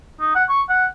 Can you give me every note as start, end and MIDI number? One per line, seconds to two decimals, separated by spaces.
0.20 0.31 63
0.35 0.44 78
0.49 0.62 85
0.69 0.86 78